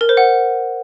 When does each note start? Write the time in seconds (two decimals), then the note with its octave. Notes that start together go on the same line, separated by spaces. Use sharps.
0.01 A#4
0.09 C5
0.17 F#5